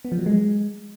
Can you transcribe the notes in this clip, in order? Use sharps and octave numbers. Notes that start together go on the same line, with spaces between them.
B3
F3
F#3
G#3